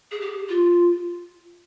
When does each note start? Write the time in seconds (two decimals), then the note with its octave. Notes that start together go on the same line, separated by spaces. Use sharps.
0.11 G#4
0.20 G4
0.49 F4